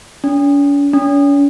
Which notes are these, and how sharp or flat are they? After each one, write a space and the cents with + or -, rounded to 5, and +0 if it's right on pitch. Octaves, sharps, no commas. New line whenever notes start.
C#4 +45
C#4 +40